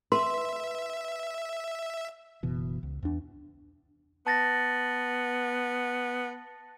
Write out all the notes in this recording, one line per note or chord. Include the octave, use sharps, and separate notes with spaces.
B4 E5 C6
F#1 B2 E3
C#2
E2 D4
B3 A5 A6 A#6